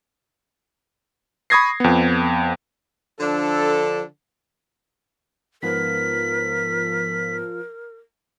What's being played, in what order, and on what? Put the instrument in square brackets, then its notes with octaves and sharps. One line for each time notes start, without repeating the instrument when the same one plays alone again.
[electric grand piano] B5 C#6 D#6 G#6 A#6 C7
F2 B3
[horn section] D3 F3 D4 A4
[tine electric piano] G#2 B3 B4 [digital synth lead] F3 [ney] A#4 [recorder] B6